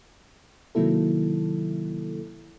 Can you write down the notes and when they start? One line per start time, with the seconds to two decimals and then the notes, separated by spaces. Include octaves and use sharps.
0.75 C3 D#3 F#3 A#3 E4 A4